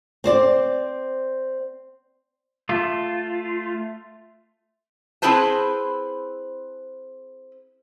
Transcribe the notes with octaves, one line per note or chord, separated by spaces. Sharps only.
C4 C5 D5
A3 F4
C4 E4 G#4 B4 C5 A5